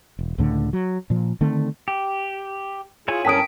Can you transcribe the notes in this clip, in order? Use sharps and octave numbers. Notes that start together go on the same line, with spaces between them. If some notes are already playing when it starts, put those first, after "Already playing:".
E1
C#2 A2 D3 A3
F#3
A#2 F3
D3 D#3 A3 C4
G4
E4 F4 G#4 C#5 G#5
G2 C#4 A#4 G5 A5 D#6 B6 D7